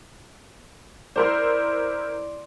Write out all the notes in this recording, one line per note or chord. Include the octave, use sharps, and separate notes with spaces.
E4 A#4 C5 D5 C6